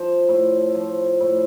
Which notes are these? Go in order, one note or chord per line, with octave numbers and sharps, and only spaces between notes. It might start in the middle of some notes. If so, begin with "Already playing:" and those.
Already playing: F3 C5
A2
F3
A2